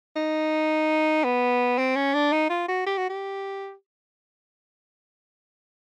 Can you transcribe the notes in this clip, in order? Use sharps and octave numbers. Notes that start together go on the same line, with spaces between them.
D#4
B3
C4
C#4
D4
D#4
F4
F#4
G4
F#4
G4